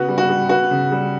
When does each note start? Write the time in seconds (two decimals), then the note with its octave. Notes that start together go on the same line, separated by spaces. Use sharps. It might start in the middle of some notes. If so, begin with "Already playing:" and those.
Already playing: C#3 B3 F#4
0.08 G3
0.18 F#4
0.29 G3
0.49 B3 F#4
0.71 C#3
0.92 G3